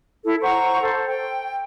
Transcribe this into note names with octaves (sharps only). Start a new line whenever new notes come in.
E4 A4
C5 F#5 A#5 C#6
A4 C5
G5